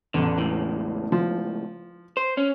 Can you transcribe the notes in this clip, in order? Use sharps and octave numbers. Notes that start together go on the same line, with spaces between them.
A1 E2 D3
C#2 A2
F3
C5
C#4